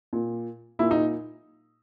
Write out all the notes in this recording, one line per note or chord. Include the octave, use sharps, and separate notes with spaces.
A#2
A#2 E4
D#4